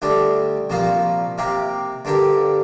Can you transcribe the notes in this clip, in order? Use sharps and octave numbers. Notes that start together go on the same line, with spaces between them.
D2 D3 G3 D4
C2 A#2 F3 A#3 F4
C3 A#3 G4
G2 D3 A#3 G4